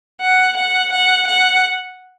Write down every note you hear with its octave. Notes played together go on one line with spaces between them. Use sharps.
F#5
F#5
F#5
F#5